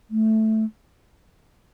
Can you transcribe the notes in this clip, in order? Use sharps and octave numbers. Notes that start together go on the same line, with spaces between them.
A3